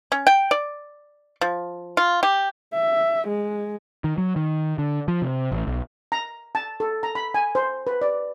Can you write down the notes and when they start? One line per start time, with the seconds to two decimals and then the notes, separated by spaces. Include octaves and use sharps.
0.12 C#4
0.27 G5
0.51 D5
1.41 F3
1.97 F4
2.23 G4
2.74 E5
3.28 G#3
4.04 D#3
4.18 F#3
4.36 D#3
4.78 D3
5.08 F3
5.22 C3
5.52 A1
5.67 B1
6.12 A#5
6.55 A5
6.80 A4
7.03 A#5
7.15 B5
7.34 G#5
7.55 C5
7.87 B4
8.02 D5